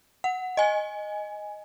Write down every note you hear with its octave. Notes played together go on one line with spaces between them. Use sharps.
F#5
D#5 G#5